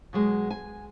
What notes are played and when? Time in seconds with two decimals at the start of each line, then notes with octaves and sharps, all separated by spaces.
0.13 B2 F#3 G#3
0.50 G#5